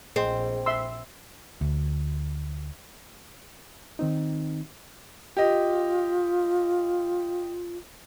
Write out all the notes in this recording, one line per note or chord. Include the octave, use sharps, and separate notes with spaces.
A#1 C4 G#4 D#5 G5
E5 C6 E6
D2
D#3 C4 D#4
F4 G4 D#5